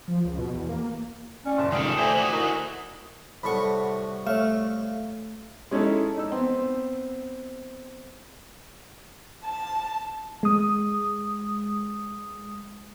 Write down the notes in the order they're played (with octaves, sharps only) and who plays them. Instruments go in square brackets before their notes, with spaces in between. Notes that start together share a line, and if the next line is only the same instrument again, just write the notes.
[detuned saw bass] F3
C#2
B2
E2
A#3
[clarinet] C#4 [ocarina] D5
[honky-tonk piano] F#1 A5
[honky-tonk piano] F1 C#2 D7 [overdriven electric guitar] D#3 A4 [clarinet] C#4 [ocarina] D#6
[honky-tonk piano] A3 D5 E5 [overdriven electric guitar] C5 A#5 [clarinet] G#5
[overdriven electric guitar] D3 F#4
[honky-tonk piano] D#4 E4 A#4
[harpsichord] C2 A2 C#6 [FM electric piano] F#5 A5 B5
[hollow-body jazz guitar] A3 [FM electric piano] C#5 E5 F5
[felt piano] G#3 C#4 D#4 E4 A4
D#4 E6
B3 C4
[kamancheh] A5
[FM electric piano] G#3 D#6